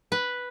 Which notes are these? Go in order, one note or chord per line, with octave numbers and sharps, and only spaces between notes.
B4